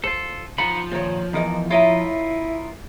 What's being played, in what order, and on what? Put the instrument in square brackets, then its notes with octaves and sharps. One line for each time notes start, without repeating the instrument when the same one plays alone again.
[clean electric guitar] F4 A4 [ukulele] C5
[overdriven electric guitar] F3 [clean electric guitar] D#4 F#5 B5 [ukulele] A#5
[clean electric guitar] A#2 D#3 [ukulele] C5 C#5
[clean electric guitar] E2 E3 [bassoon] D#4 [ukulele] F4 A#4 D#5
[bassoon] E4 [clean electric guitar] F4 A#4 D#5 [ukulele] C#5 E5 A#5